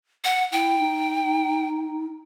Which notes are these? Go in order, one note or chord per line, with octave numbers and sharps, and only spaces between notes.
F#5
E4 G5
D#4